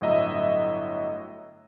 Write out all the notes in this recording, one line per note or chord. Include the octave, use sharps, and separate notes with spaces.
G1 A2 F#3 D#5 E5 A#5